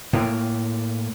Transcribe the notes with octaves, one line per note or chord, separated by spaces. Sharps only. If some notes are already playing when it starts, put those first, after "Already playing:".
A2 A#3